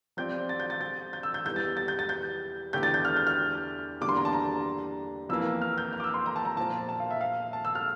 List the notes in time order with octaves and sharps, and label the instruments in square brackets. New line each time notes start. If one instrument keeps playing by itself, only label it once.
[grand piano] F3 C4 G4 D5 [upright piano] G6
[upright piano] A6
G6
A6
A6
G6
E6
G6
[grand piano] E2 E3 G3 [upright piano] G6
[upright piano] A6
A6
G6
A6
G6
[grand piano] E2 D3 A3 E4 G4 [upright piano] G6
[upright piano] A6
G6
F6
G6
F6
[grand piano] E2 D3 G3 A#3 D4 [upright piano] D6
[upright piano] C6
A#5
A5
A#5
[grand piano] F2 E3 A#3 [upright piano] E6
[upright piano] F6
G6
F6
D6
E6
C6
A#5
A5
A#5
[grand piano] A#2 F3 A#3 F4 C5 [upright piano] A5
[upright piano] A5
F5
E5
F5
A5
E6
F6